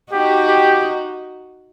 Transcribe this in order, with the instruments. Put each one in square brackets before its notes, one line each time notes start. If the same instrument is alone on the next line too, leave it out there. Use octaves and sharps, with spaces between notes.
[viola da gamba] D#4 F#4 [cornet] G4
[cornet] G4